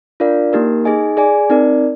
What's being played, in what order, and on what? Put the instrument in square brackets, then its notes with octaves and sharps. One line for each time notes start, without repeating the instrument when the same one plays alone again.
[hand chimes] D4 F4 A#4 D5 F5
A#3 D#4 G4 A#4
D#4 G#4 D#5 G#5
G#4 D5 G#5
C4 D#4 A#4 D5